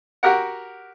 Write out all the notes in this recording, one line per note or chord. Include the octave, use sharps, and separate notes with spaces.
F#4 G4 A#4 F#5